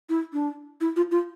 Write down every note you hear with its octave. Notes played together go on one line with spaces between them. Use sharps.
E4
D4
E4
F4
F4